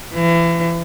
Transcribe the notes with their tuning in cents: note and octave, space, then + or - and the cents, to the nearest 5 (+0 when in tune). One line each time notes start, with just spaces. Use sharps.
E3 +35